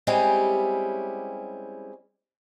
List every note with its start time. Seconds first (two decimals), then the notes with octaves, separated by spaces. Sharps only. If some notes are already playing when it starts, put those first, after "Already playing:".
0.07 G3 G#3 C4 C#4 E4 G4